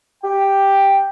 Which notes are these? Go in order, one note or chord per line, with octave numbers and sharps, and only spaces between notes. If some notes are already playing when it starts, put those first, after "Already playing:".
G4 G5